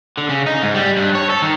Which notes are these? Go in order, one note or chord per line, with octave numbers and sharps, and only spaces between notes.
D3
C#3
D#4
G#2
G3
G2
C#5
A4
D#3